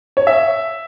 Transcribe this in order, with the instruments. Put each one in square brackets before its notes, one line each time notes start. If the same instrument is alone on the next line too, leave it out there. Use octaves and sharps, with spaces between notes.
[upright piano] C#5
E5